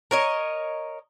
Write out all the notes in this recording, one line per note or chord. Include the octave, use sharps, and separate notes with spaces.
A#4 C#5 D#5